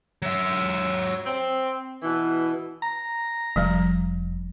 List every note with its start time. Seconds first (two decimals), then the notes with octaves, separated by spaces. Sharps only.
0.22 F#3 E5
1.26 C4
2.03 B2 E3
2.83 A#5
3.56 F1 F3 G3